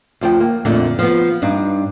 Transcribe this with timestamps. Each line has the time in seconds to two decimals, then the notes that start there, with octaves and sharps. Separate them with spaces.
0.21 D2 F3 C#5 G5
0.40 A#3
0.65 F2 A#2 D3 A3
0.99 F3 B3
1.42 G2 D4 D#4